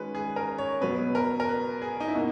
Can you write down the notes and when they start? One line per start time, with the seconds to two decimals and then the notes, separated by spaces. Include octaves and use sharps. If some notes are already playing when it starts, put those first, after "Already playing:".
Already playing: D#3 G#3 C#4 F#4 B4
0.15 G#4
0.36 A#4
0.58 C#5
0.81 B2 F#3 B3 B4
1.15 A#4
1.40 A#4
1.49 B4
1.82 G#4
2.00 D#4
2.08 E4
2.15 B2 A#3 F#4